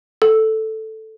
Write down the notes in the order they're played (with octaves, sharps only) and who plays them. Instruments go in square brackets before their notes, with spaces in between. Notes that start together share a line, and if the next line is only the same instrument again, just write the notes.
[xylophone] A4